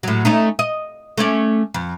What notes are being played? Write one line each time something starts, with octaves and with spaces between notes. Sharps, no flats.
A2 F#3
A3 C#4 D#4
D#5
A3 C#4 D5
F2